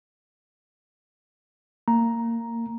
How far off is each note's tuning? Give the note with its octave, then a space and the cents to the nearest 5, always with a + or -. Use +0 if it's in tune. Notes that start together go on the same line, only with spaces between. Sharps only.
A#3 -20 A#5 +5